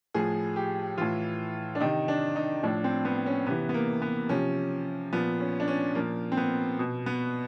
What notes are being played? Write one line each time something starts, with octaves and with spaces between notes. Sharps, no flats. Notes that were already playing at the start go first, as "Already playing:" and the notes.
A2 F3 G#4
G4
A2 E3 F4
D4
C3 D#3 D#4
D4
D#4
A2 F3 D4
C4
B3
C#4
C3 E3 B3
B3
A#3
B3
C3 F3 C#4
A#2 F3 B3
C#4
D4
C#4
A#2 F3 A#3
C4
B3
B2
B3